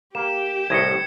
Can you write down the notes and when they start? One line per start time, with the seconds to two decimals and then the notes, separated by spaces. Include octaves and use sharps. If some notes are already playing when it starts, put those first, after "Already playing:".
0.15 A#3 G4 E7
0.70 C2 A2 D#5 G#6 C#7